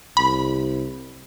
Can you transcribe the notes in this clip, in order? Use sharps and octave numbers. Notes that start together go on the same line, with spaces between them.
C2 B5